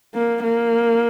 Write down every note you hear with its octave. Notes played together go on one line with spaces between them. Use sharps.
A#3
A#3